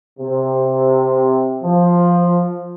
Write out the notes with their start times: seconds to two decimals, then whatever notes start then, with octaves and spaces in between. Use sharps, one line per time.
0.20 C3
1.63 F3